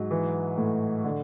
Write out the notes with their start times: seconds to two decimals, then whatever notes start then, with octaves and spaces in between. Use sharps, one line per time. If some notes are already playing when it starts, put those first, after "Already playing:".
Already playing: G#2 F#3
0.11 E3
0.57 A2
1.04 D3